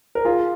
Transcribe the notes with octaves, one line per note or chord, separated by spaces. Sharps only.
A#4
F4 G#4